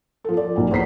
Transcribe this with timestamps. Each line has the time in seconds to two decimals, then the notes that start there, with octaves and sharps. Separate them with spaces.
0.24 F3 A4
0.37 D5
0.56 B1 D#4 G#5
0.71 E2 C5 B6 C7